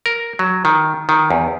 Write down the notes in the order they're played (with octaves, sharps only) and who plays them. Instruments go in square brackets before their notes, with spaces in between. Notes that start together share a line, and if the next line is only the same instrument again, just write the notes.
[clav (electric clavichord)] A#4
F#3
D#3
D#3
E2